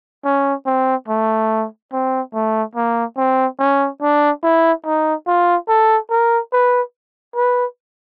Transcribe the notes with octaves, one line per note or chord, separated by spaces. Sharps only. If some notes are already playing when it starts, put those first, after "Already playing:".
C#4
C4
A3
C4
A3
A#3
C4
C#4
D4
E4
D#4
F4
A4
A#4
B4
B4